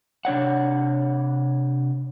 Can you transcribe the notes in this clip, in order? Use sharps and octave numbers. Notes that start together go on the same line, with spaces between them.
C3 D4 C#5 F#5